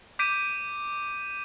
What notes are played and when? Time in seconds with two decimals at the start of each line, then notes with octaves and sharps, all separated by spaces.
0.19 D6 G6 B6 D7 D#7